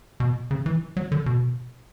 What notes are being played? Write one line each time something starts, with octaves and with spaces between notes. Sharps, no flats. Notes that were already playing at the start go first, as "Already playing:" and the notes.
B2
C#3
E3
F#3
D3
B2